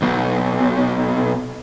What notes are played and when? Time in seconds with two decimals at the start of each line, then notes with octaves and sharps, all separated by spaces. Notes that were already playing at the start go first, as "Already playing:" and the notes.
0.02 B1 B2